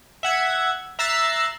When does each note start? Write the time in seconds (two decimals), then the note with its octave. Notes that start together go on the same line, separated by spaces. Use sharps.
0.23 E5 F#5 G#6
0.99 E5 A#5 E6 F#6 A6 C7